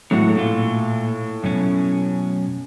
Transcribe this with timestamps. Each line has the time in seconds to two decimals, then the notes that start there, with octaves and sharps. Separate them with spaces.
0.11 A2 F#3 G#3 F#4
0.36 A#2 A3 F4
1.44 F#2 B2 C#4